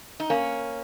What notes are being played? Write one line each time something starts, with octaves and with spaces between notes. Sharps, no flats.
D#4
A#3 C#4